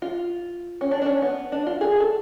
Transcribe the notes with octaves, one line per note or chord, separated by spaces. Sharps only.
F4
C#4
D4
D4
C#4
B3
D4
F4
G#4
A4